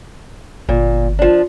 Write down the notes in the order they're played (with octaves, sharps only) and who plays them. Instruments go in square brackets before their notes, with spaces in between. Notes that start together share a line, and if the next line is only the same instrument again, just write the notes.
[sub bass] G1 [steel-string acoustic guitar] A#2
[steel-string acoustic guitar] F3 D4